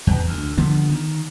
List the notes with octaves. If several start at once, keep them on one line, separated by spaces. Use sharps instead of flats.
E2
D2
D3 F3 B3
D#3